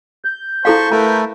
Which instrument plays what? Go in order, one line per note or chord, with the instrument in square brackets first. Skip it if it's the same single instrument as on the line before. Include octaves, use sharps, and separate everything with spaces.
[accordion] G6
[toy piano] E4 A4 F5 [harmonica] C5 A5 C#6
[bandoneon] A3 [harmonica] A#4 B4 [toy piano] A#5